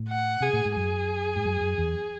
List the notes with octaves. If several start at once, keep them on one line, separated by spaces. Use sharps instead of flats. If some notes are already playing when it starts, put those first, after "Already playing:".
Already playing: A2
F#5
C3 G#4
A2
G#2
F#2 G#4
G#2
F#2
F#2
E2